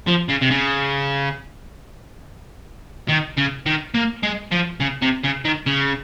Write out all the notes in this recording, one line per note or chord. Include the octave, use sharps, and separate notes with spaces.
F3
C#3
C3
C#3
D#3
C#3
D#3
A#3
G#3
F3
C#3
C3
C#3
D#3
C#3